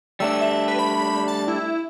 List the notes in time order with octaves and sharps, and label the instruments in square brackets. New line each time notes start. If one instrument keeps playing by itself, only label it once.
[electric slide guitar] G3 A3 D4 [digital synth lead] E6
[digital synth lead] E5
B4
B5
A5
E4